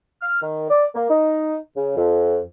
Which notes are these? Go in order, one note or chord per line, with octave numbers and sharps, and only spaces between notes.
F6
D#3
D5
A#3
D#4
C#3
F2